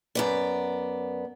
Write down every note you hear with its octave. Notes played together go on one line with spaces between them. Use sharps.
F#2 B3 D5